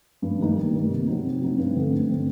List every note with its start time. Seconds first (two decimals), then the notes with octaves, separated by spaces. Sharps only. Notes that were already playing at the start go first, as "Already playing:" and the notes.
0.22 G2
0.38 D#3 G3 A#3 D#4
0.56 G2
0.73 D#3 G3 A#3 D#4
0.90 C3
1.07 F#3 C4 D#4
1.24 C3
1.41 F#3 C4 D#4
1.58 G2
1.75 D3 A3 C4
1.91 G2
2.09 D3 A3 C4